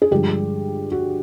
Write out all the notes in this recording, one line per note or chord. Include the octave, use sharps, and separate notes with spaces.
G#4
G2 D3 F3 G#3 G4
F#4